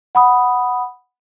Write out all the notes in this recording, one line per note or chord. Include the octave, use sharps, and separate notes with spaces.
F#5 B5 D#6